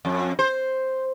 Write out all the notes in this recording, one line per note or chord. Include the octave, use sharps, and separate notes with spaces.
F2
C5